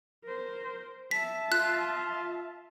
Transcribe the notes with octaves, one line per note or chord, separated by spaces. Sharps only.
A#4 C5
E5 A5 B6
F4 F#6